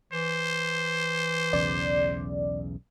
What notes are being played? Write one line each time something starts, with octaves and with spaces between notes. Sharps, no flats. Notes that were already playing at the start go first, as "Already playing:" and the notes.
E3 C5
B1 E2 C#3 D5